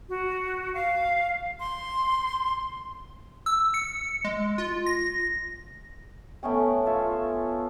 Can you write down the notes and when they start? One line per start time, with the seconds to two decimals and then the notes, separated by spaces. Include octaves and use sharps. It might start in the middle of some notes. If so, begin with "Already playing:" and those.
0.09 F#4
0.74 F5
1.60 C6
3.46 E6
3.74 C#7
4.24 G#3
4.58 F4
4.86 A#6
6.43 A3 B3 C#4 G5
6.86 F4 C#5 E5